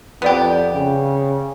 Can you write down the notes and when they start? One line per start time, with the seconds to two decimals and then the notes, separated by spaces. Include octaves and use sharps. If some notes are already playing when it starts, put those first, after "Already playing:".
0.22 F2 B3 G4 B4 D5 G5
0.75 C#3